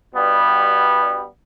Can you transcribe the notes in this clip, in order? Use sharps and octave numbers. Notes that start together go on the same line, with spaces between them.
G2 B2 G3 B3